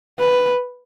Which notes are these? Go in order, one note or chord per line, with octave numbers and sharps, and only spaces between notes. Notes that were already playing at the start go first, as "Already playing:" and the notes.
B4